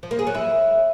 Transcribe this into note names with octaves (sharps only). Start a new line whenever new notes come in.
F3
A#3
G#4
F#3
E4